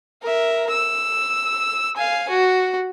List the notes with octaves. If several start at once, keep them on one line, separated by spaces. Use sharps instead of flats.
A#4 E5
E6
F5 G#5
F#4